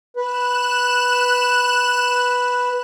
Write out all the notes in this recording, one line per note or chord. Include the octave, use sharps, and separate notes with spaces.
B4 F#6 E7